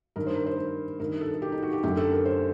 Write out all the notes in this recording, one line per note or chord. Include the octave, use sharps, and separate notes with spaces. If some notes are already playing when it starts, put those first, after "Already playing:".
G2 D#3 A#4
C5
A#4
C5
A#4
G2 D#3 A#4
A4
A4
G4
D#4
F#4
G4
F#2 D3 G4
A4
A#4
C5